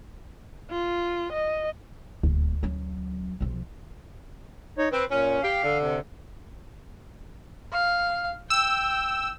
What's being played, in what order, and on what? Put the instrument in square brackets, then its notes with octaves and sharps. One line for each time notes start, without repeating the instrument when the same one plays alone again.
[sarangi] F4
D#5
[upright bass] D#1 [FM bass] D2
[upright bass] F#3 C#4
B1 F3
[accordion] D#4 C#5
[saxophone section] C4 [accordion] B4
[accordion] A#2 [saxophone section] C#4
[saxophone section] G4 [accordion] F5
[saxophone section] D3
[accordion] C3
[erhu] F5
[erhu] G5 [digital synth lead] E6